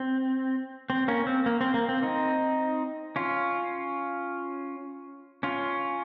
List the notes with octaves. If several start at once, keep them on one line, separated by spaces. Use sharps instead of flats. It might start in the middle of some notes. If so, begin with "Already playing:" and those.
Already playing: C4
C4
A#3 C#4
C4
A#3
C4
A#3
C4
C4 D#4
C#4 F4
C#4 F4